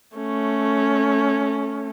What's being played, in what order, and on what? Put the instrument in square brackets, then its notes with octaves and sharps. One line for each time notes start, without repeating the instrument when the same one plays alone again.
[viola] A3 C#4